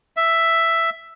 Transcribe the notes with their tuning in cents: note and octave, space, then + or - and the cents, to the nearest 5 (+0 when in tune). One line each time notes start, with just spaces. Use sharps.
E5 +5